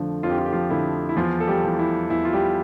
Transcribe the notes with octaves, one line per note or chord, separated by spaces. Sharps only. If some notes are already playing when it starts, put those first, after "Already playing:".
Already playing: F2 D3 F3 A3
F2 F4
G4
F4
G4
F3 F4
D3 F3 E4
E4
E2 F3 F4
A4
G3 G4
E3
E4
E2 E4
F4
G3 G4